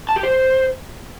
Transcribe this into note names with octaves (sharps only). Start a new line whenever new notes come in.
A5
G4
C5